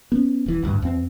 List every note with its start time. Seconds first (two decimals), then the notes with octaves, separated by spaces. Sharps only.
0.12 B3 C#4
0.46 D#1 E3
0.62 G#1 D2 G2
0.82 E2 C4